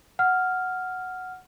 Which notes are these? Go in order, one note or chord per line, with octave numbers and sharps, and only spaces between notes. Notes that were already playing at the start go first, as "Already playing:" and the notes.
F#5 F6